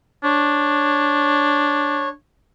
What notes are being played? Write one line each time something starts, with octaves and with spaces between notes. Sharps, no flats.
D4 C#5